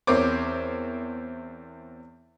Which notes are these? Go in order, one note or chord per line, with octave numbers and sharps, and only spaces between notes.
E2 C4 A#4 C5 C#5 D6